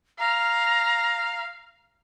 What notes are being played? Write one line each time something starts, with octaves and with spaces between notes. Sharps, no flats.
F5 A#5